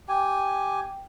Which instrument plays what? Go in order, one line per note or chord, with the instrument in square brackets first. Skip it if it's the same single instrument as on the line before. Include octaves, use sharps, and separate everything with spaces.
[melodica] G4 G#5 [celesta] G5